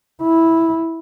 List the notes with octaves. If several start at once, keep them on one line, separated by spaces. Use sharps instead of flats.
E4